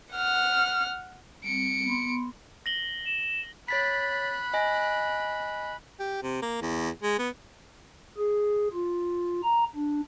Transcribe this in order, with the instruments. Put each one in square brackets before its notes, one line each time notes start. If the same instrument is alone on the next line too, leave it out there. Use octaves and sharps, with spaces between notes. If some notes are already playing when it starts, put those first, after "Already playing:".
[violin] F#5 F6
[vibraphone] G3 C4 [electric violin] C#7 D7
[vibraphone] B3 B5 C6
[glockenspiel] A#6 F#7 G7
[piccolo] E7
[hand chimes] C#5 A6 B6 [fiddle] B5 F#6
[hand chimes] D#5 G#5 A#6
[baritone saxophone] G4
C3
A#3
E2
G#3
B3
[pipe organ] G#4
F4
A#5
D4